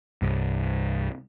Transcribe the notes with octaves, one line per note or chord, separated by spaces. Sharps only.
C2 G2